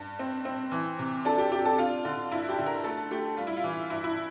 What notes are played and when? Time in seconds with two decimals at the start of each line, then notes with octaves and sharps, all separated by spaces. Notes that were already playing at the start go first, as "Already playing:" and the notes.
Already playing: G2
0.19 C4
0.45 C4
0.72 E3
0.99 C3
1.25 D4 A4
1.38 G4
1.52 D4 G4
1.65 A4
1.78 D4 F4
2.05 D3
2.32 G2 E4
2.49 G4
2.58 D3
2.66 A#4
2.84 A3 A4
3.11 A3 G4
3.37 G3 F4
3.47 E4
3.57 F4
3.64 E3
3.90 G2 E4
4.04 E4